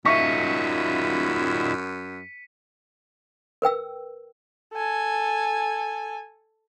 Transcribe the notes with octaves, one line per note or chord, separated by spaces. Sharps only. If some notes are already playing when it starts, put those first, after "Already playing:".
F#2 D#4 F4 E5 C#6 B6 C#7 D#7
A#4 B4 G5 E6
A4 G#5